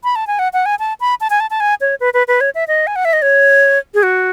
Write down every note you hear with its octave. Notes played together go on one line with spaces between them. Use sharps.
B5
A5
G#5
F#5
F#5
G#5
A5
B5
A5
G#5
A5
A5
G#5
C#5
B4
B4
B4
C#5
E5
D#5
G#5
F#5
E5
D#5
C#5
G#4
F#4